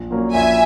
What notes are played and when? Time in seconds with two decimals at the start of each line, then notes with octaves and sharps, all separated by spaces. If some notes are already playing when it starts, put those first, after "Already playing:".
Already playing: A#1
0.11 A#2 F#3 A#3 C#4
0.34 A#1 E5 G#5